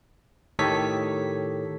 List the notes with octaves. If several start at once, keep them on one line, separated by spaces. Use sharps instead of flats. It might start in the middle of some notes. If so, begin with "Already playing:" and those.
A2 D#3 G4 A4 C#5 B6